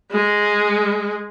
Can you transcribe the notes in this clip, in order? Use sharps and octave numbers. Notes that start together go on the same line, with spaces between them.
G#3